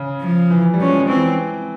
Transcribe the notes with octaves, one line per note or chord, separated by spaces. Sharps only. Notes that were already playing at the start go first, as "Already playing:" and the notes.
Already playing: C#3
F3
E3
G3
F3 C#4
G#3
F3
E3 C4